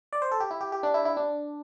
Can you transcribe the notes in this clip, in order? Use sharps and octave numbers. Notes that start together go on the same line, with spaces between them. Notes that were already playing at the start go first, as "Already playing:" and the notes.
D5
C5
A4
G4
E4
G4
G4
D4
E4
E4
D4